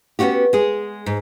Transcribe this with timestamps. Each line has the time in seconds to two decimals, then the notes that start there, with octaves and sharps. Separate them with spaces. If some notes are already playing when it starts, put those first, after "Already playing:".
0.19 B3 C#4 D#4 F#4 G4
0.53 G#3 G#4
1.06 G#2